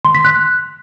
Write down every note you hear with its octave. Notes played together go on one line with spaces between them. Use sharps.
C6
B6
F#6